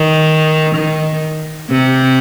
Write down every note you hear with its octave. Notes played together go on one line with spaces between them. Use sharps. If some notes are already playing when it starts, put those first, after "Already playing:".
Already playing: D#3
D#3
C3